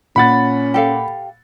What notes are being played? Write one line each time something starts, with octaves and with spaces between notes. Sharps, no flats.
A#2 C#4 F#5 B5 A6
G4 A4 F5